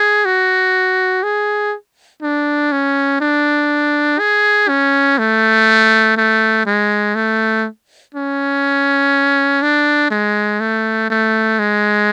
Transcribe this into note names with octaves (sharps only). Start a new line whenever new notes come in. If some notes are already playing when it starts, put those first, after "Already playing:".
Already playing: G#4
F#4
G#4
D4
C#4
D4
G#4
C#4
A3
A3
G#3
A3
C#4
D4
G#3
A3
A3
G#3